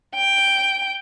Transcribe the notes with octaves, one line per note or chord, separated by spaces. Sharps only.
G5